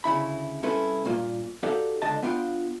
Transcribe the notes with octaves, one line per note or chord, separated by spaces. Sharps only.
D2 C#3 E4 B5
C2 C4 C#4 E4 A4 B4
G2 A#2 A#3 F4
D#4 F#4 G4 A4 D5 F5
C#2 D3 D#5 A5
B3 D4 F4 F5 G5